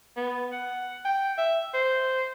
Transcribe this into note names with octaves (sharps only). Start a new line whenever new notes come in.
B3
F#5
G5
E5
C5